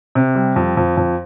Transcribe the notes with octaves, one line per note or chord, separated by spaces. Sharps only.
C3
G3
F2
F2
F2